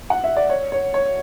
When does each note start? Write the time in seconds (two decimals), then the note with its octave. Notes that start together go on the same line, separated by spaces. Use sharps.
0.10 F#5
0.24 E5
0.36 D5
0.49 C#5
0.72 C#5
0.94 C#5